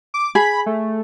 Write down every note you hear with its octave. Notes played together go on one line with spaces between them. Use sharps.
D6
G#4 B5
A3